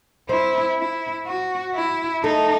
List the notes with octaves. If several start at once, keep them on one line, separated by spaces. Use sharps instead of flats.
C4 E4
E4
F#4
E4
A3 D#4